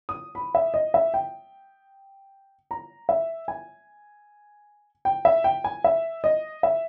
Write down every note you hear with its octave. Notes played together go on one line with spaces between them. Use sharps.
D#6
B5
E5
D#5
E5
G5
A#5
E5
G#5
G5
E5
G5
G#5
E5
D#5
E5